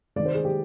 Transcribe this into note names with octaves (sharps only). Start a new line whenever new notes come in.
C3 D#3 D5
C5
G#4
G4